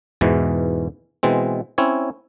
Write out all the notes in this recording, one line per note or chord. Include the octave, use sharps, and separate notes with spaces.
E2 G#2 B2 E3
B2 E3 G#3 C4
C4 C#4 E4 C#5